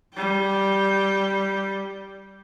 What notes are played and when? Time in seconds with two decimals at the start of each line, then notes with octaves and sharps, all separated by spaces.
0.14 G3 G5